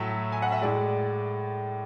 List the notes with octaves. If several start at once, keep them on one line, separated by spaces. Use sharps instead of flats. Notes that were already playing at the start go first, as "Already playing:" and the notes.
Already playing: A2 F#3 A3 E5
G#5
F#5
E5
A2 G#3 D5